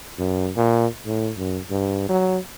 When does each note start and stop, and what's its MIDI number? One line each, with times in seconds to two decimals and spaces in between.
0.19 0.51 42
0.56 0.87 46
1.06 1.31 45
1.38 1.59 42
1.70 2.05 43
2.09 2.38 54